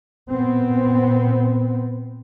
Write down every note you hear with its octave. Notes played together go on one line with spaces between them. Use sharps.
A#2 B3 C4